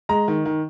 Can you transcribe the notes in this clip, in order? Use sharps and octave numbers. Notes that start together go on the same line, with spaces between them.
G#3 A#5
D#3
D#3